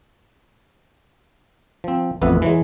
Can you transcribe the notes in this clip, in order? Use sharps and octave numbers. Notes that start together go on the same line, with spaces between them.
F3 C4
A1 F2 B3 B4 E5
E3 F#3 G#3